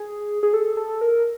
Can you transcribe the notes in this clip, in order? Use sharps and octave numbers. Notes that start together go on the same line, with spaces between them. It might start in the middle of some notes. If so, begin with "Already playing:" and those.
Already playing: G#4
G#4
A4
A4
A#4